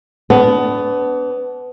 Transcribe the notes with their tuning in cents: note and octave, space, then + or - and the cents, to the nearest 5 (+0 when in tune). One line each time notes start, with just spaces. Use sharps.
B3 +20 D4 -25